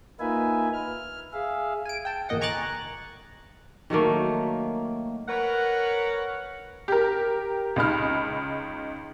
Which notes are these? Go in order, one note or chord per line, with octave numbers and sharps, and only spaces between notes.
A#3 D#4 F4 B4 E5 G#5
F6
G#4 E5 F5
G#5 D7
G5 A5
G1 E2 A#3 D#5 F#5
G#5 A#5 C#6 D6 F#6 A6
D#3 F#3 A3 A#3
A#4 B4 C#5 F#5
G4 A#4
C#2 D#4 B5 F6